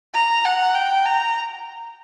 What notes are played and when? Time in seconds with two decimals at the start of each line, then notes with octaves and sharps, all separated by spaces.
0.14 A#5
0.45 F#5
0.75 G5
1.06 A#5